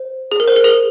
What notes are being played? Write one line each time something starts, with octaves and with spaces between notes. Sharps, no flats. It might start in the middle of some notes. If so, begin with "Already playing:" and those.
Already playing: C5
G#4
A#4
C5
A#4
G#4